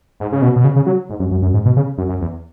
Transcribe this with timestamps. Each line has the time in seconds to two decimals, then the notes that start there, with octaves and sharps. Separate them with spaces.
0.20 G#2
0.32 C#3
0.42 B2
0.56 B2
0.64 C#3
0.76 C#3
0.86 F#3
1.10 G#2
1.20 F#2
1.31 F#2
1.42 F#2
1.54 G#2
1.65 B2
1.76 C#3
1.98 F#2
2.09 F#2
2.21 E2